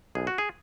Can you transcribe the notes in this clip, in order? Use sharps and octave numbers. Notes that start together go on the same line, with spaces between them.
B1 G#4
F#4
G#4